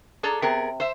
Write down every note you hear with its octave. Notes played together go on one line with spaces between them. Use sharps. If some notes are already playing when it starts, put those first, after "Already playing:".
D4 G#4 A4 A#5
C3 B3 G#4 A#4
C5 E5